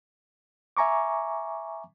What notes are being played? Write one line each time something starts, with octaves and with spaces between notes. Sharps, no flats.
E5 G#5 A#5 C#6 D6